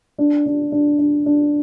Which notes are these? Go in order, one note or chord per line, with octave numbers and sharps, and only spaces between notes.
D4
D4
D4
D4
D4